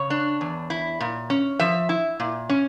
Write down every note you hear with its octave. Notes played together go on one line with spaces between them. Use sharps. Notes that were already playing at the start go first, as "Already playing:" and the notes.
Already playing: C#3 C#5
D4
E2
E4
A#2
C#4
F3 E5
E4
A#2
C#4